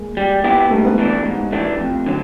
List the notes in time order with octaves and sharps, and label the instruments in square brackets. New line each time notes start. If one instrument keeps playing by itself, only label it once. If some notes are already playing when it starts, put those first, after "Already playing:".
Already playing: [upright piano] G#3 A#3
[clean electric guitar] G3
B3 E4 G4
[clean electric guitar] G#2 [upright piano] G3 A3
[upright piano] A3 B3
[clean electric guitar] E3 A3 D4
G#2
E3 A3 D4
F2
D3 F#3